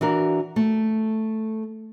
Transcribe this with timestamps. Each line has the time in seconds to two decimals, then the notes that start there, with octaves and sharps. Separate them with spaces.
0.01 E3 D4 F#4 A#4
0.56 A3